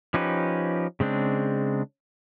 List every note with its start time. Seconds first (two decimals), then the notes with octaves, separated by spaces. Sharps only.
0.14 F3 C#4 D#4 G4 B4
1.00 C#3 G#3 C4 D4